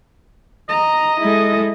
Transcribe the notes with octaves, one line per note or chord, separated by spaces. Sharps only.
D#5 A#5
G#3 E4 A4